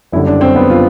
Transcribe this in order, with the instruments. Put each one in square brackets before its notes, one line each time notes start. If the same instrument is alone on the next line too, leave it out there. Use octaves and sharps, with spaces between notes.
[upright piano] F#1 F#2 D3 G3 E4
D4
C4
B3
F4